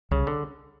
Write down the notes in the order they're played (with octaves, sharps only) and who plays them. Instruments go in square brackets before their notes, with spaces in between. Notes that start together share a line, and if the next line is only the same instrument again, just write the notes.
[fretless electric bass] C2 [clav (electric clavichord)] C#3
[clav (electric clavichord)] D3